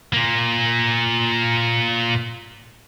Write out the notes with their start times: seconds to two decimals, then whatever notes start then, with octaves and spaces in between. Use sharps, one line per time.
0.13 A#2 A#3